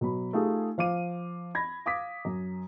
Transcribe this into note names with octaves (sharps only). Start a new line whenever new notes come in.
B2 F#3 B5
A3 D#4 F4 G4 G#4
F3 F5 D6 D#7
B5 G#6 A#6
F5 D6 D#6 B6
F#2